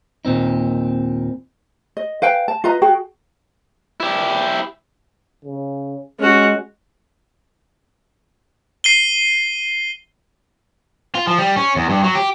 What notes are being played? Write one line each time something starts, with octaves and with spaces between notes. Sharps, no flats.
D#2 A#2 C4 D#4
D#5
B4 F5 G5 G#5
A5
F4 B4 D#5 A#5
F#4 G#4 G5
E4 G4
C#3
G#3 C#4 F#4
C7 D#7 G7
F4
F3
G3
C#4
E2
G2
F#3
G4